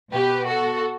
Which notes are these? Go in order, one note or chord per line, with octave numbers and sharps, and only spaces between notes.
B2 G4 B4
F#4 A4